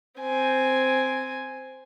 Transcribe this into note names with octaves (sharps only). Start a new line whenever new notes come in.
C4 G#5